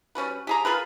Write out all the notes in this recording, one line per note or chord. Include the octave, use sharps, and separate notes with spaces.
G3 C#4 F#4 B4
G4 G#4 A#5
F4 G#4 A#4 B4